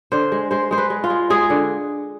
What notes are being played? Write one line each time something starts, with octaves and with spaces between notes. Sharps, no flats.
D3 C5
G#3
G#3 C5
G#3 C5
B4
G#3
F4
G#3
G#3 G#4
D3